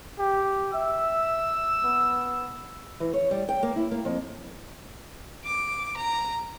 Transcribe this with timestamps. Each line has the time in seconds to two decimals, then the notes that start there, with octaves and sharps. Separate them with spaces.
0.19 G4
0.74 E5 E6
1.84 B3
3.00 E3
3.13 C#5
3.31 G3
3.49 G5
3.63 A#3
3.76 E4
3.91 A#3
4.05 F2
5.45 D6
5.97 A#5